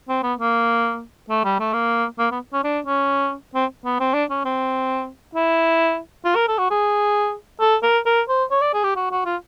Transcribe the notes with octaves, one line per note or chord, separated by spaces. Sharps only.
C4
B3
A#3
A3
G3
A3
A#3
A#3
B3
C#4
D4
C#4
C4
B3
C4
D4
C#4
C4
E4
F4
A#4
A4
F#4
G#4
A4
A#4
A#4
C5
C#5
D5
G#4
G4
F#4
F#4
F4